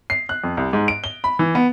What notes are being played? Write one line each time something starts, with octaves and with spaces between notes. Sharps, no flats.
C7
F#6
F2
C2
G#2
D7
G7
B5
E3
B3